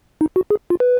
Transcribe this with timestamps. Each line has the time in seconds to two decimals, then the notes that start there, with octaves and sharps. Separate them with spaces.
0.21 D#4
0.36 F#4
0.50 G#4
0.70 F4
0.80 B4